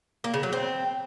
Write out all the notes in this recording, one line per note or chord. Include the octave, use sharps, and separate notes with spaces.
A#3
C#3
F#3
C4